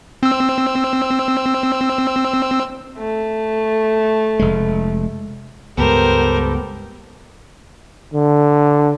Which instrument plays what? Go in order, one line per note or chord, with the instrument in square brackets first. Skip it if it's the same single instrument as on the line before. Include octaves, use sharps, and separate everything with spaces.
[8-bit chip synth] C4 E6
[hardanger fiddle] A3
[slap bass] F1 G#3
[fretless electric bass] C#2 G2 G#3 [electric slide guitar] B3 [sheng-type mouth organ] G4 A4 [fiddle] A#4 C5
[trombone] D3